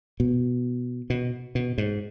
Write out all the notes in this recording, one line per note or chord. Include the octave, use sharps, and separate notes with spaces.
B2
B2
B2
G#2